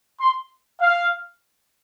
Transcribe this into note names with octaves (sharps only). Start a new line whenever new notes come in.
C6
F5